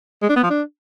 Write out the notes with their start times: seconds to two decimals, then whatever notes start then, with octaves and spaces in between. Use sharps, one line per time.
0.22 G#3
0.29 D4
0.36 B3
0.43 F3
0.50 D4